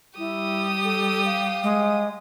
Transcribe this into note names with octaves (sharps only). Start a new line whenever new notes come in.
G3 E4 G4 D#6
A4
F5
G#3